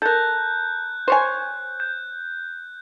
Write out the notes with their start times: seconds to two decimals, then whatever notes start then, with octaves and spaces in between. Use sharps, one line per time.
0.02 A4 A#4 F#6 G6
1.08 C5 C#5 G#5
1.80 G6